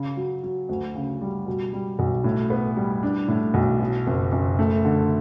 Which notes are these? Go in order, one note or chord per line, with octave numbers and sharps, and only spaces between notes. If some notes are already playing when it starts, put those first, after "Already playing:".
Already playing: C#3
F#3
F#3
D2
C#3
G3
B2
G3
B1
A2
B3
G3
D4
A2
B1
B2
F#1
F#1
A3
D3